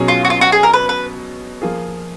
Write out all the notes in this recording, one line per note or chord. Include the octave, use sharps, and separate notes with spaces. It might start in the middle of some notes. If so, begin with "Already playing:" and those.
Already playing: B2 F#3 C#4 G#4
F4
F#4
F4
F#4
G#4
A#4
B4
B4
F3 A#3 F4 G#4